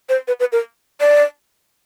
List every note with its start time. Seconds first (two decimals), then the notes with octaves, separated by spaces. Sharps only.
0.09 C5
0.28 B4
0.40 B4
0.52 A#4
1.01 D5